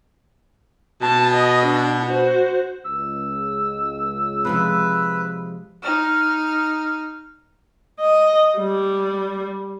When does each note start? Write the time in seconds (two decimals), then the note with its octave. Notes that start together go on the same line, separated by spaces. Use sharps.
1.02 B2 A5
1.35 D#5
1.66 D4
2.06 F#4 C5
2.85 C#2 E6
4.45 C3 F3 G#3 B4
5.82 D#4 F6
8.01 D#5
8.58 G3